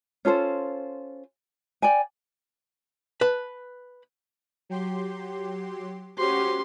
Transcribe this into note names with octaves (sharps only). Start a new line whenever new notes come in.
C#4 F4 A4 C5
D5 G5 G#5
B4 A5
F#3 G4 C6
C#4 F#4 G4 C5 C6